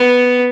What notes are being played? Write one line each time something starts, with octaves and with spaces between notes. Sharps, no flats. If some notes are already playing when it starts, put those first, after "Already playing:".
Already playing: B3